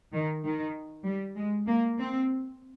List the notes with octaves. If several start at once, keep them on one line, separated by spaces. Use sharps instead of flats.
D#3
D#3
G3
G#3
A#3
C4